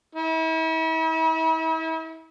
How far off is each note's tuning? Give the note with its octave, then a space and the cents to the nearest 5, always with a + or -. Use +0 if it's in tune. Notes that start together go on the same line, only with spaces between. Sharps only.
E4 -40